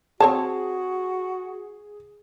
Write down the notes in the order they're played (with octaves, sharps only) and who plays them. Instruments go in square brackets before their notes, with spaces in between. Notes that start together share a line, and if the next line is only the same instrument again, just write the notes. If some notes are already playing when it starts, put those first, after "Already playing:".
[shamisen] C4 C#5 A5 [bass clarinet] F#4 [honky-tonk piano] G#4